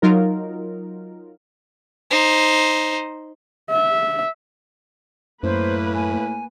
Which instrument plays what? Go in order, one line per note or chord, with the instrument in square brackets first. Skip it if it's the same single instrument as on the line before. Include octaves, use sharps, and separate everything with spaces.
[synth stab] F#3 D#4 F4 A#4
[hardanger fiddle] D#4 C5
[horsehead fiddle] E5
[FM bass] F#2 [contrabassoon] A2 [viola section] A#3 B4 [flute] C5
[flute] G#5